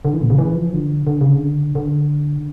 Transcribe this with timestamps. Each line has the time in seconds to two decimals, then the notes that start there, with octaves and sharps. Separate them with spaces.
0.05 D3
0.13 E3
0.22 A#2
0.30 C#3
0.38 E3
0.56 F3
0.73 D3
1.07 D3
1.21 C#3
1.35 D3
1.75 D3